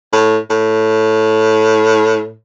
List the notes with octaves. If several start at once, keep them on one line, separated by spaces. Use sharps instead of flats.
A2
A2